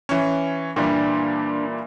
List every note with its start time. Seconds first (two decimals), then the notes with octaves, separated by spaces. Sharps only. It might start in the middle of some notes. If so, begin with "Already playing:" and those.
0.09 E3 C#4
0.76 A#2 E3 G3 D4